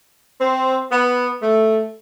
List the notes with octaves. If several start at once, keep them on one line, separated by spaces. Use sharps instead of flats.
C4
B3
A3